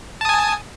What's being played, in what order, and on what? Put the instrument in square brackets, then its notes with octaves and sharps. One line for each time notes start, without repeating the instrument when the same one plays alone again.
[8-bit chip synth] A5
D#6
G#5